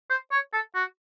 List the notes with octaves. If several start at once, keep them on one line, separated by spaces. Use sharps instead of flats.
C5
C#5
A4
F#4